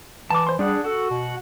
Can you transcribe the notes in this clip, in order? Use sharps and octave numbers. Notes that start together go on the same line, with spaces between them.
E3 A5 D6
C5 C6
G3 D4 G#4 F#5
F#4 A4
B2